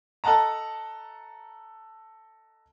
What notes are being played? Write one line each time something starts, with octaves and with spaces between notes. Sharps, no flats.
A4 D#5 F#5 A5 A#5